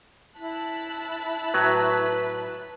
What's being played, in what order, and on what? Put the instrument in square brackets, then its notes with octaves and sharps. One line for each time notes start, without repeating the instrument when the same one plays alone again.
[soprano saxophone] E4 [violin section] A5 F#6 B6
[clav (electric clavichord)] A2 F#3 [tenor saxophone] B4